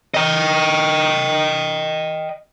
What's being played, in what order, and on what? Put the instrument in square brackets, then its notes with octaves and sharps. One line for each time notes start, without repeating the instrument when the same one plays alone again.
[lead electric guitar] D#5 G5